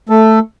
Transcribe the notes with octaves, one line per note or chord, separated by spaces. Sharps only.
A3 A4